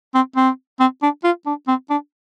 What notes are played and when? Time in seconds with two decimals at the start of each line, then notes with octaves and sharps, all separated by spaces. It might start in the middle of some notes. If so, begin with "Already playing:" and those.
0.15 C4
0.36 C4
0.80 C4
1.02 D4
1.24 F4
1.47 D4
1.68 C4
1.90 D4